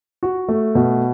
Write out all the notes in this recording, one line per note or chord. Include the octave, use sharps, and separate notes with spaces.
F#4
A3
B2